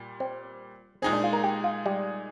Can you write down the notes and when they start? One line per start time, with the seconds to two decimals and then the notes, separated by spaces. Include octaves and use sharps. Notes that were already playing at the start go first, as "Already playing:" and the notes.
Already playing: A#2 G3
0.20 C4
1.02 A#2 G#3 C4 D#4 G#4
1.13 D4
1.24 F4
1.33 A#4
1.44 G4
1.64 F4
1.86 G3